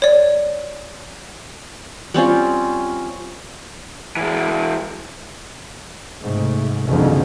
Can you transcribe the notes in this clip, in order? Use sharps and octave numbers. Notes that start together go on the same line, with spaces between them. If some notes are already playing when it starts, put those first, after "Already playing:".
C#5 D5
G3 C4 C#4 F4
E3 G#3
G#2 C3 A3
F#1 C2 F2 D3 D#3 F3